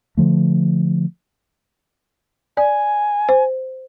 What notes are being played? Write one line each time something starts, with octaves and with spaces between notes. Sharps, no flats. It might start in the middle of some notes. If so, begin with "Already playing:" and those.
D3 F3 A3
D5 G#5
C5